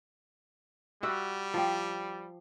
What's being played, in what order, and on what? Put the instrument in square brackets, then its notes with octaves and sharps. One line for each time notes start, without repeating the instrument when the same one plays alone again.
[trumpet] G3 [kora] F#4 E5
[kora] F3 G4